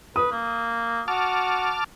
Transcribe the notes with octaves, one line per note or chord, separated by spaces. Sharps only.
B4 D#6
A#3
F#4 A5 D6 F6